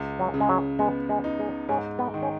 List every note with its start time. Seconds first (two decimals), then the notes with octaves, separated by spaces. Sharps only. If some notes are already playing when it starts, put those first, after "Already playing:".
Already playing: C#2
0.19 F#3
0.34 C#3
0.40 G#3
0.49 F#3
0.79 G#3 B3
1.09 G#3
1.24 D#4
1.39 G#3
1.69 G#2 C#4
1.99 B3
2.14 D#3
2.22 C#4